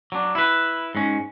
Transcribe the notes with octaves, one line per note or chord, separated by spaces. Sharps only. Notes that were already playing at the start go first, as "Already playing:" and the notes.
F#3 D4
E4 B4
G#2 C#4